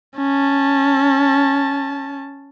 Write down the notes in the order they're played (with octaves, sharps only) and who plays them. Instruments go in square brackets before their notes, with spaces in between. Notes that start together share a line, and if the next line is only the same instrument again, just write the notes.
[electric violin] C#4 A5